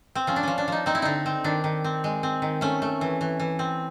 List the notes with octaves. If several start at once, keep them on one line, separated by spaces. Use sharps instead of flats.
C4
F3 C#4
D4
F3 C#4
D4
F3 D#4
C4 D#4
E4
D3 D#4
C4
D#3 D4
D#3
C4
G#3
C4
D#3
A3 C#4
A3
E3
E3
E3
C4